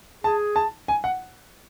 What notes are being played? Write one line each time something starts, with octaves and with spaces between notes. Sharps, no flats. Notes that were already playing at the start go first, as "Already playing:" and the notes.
G#4 A5
A5
G#5
F#5